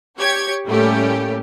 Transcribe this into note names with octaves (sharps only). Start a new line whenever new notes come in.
G4 C#5 G5 C#6 G#6
A2 G3 A3 A#3 C#4 G4